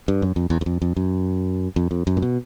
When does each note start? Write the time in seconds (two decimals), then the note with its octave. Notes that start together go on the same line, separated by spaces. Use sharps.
0.08 G2
0.22 F#2
0.36 F2
0.50 E2
0.61 E2
0.66 F2
0.82 F2
0.97 F#2
1.76 F2
1.91 F2
2.07 F#2
2.17 A#2
2.22 B2